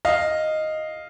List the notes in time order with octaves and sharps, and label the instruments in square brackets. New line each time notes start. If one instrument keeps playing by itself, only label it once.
[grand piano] D#5 F5